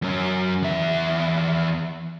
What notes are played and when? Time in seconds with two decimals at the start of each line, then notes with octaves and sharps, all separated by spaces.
0.02 F#2 C#4
0.62 E2 E5